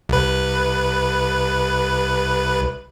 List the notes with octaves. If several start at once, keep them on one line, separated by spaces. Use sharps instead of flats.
C2 B4